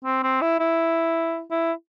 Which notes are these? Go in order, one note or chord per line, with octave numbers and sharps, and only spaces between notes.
C4
C4
E4
E4
E4